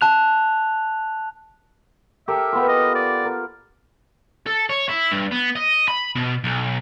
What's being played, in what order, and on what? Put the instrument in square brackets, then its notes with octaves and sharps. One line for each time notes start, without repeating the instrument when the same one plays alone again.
[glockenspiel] A5 F#6 F7
[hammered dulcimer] G4 A4 A#4 [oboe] E5
[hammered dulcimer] B3 F4
[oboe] D#5
D5
[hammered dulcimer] A#4
[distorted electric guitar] A4
C#5
E4
G2
B3
D#5
B5
B2
B1